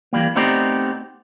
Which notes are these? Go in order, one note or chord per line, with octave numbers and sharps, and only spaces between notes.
E3 G3 A#3
A3 B3 C4 D#4 G4 D5